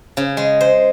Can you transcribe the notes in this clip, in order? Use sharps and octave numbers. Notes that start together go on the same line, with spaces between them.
C#3
G#3
C5